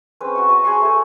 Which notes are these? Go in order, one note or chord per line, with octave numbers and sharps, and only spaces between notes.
C4 C#4 G#4 B4
F#4 C#6
F#4 B4 A5
G#4 C#5 C6 C#6
A3 G#4